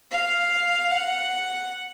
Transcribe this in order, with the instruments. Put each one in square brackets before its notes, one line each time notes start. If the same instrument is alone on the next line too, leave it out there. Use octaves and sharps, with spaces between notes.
[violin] F5
F#5